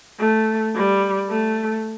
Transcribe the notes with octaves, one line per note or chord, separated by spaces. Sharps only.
A3
G3
A3